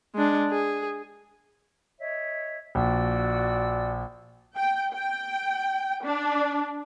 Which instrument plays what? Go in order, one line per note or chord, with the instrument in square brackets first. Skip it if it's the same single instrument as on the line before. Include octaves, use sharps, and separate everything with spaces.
[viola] G#3 D4
G#4
[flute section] C#5 D#5 E5
[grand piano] A#1 [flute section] F#4 D5 E6
[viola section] G5
G5
D4